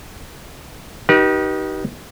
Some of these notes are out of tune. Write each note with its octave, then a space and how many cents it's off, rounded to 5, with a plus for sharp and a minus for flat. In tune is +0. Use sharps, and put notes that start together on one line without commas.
D#4 +0 G4 -30 B4 -40